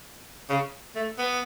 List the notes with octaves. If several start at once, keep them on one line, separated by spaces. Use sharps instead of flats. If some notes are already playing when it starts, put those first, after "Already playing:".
C#3
A3
B3